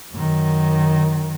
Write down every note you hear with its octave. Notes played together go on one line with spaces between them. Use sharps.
F#2 D#3